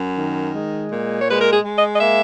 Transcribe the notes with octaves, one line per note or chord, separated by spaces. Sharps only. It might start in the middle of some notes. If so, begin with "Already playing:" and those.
Already playing: F#2
D#3
G#3
A#2
C#5
G#3 B4
A#4
G#4
G#3
D#5
D#5
A#3 E5